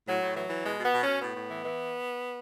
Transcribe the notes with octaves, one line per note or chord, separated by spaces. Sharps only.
A2 F#3
A2
E3 F#3
E3
B2 G#3
B2 B3
B2
C#4
B2
A2 B3
A2
E3
E3